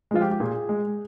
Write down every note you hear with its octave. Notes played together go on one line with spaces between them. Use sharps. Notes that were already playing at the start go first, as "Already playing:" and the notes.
F3 G#3 F4
G4
G4
A#2 G#4
G#3